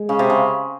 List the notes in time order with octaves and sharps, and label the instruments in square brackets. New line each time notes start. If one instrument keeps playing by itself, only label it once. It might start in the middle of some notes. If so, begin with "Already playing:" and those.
Already playing: [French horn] G#3
[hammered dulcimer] C#3
C3
C#3